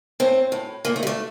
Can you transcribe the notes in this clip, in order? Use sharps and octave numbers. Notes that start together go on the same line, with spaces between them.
A2 C4
A2
A#2 A#3
A3
G3
A3